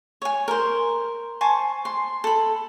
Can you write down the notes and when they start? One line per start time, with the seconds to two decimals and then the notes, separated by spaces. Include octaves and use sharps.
0.22 C#5 G#5
0.48 A#4 C5
1.41 C5 G#5 A5 C#6
1.85 C6
2.24 A4 B5